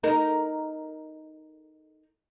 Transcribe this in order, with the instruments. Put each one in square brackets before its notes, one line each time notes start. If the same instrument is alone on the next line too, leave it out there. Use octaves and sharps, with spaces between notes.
[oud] D#4 A#4